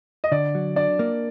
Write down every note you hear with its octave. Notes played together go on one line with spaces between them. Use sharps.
D#5
D3 D5
F#3
D4 D5
A#3